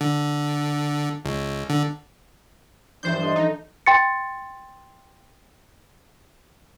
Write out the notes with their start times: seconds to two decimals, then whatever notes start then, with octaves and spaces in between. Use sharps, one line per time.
0.01 D3
1.25 C#2
1.70 D3
3.03 G2 E3 F3 D4 C5 G6
3.22 D4 A4 D#5
3.36 D#4
3.86 G5 C6 A6 C#7